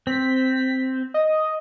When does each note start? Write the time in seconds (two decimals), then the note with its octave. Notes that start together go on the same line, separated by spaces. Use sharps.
0.07 C4 B6
1.14 D#5